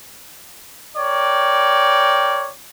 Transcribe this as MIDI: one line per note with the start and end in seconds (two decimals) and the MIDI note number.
0.97 2.51 70
0.97 2.51 73
0.97 2.51 74
0.97 2.51 79